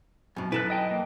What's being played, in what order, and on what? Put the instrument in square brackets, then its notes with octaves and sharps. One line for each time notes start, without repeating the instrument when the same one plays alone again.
[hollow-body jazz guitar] F#2 B2
[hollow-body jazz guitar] F#2 A4 B4 [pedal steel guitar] E4 F#6
[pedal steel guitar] D#5 G5 A5
A#3